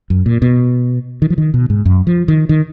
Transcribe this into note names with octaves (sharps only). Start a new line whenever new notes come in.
F#2
A#2
B2
D#3
F3
D#3
B2
G#2
F#2
F3
D#3
D#3